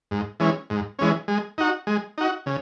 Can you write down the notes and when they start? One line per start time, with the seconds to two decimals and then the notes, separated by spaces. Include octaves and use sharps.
0.11 G#2
0.40 E3 G#3 C#4
0.70 G#2
0.99 E3 G#3 C#4
1.28 G#3
1.58 D#4 F#4
1.87 G#3
2.18 D#4 F#4
2.46 C#3